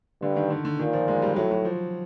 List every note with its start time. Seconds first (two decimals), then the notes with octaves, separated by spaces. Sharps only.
0.22 G2 D3
0.36 D#3
0.50 D3
0.65 D3
0.79 A#2 D#3
0.93 F3
1.08 G#3
1.22 G3
1.36 A2 F#3
1.51 F#3
1.65 F3